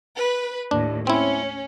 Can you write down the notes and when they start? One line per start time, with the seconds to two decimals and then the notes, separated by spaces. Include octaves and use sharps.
0.17 B4
0.71 D#2 A2 D4
1.07 C4 C#4 E4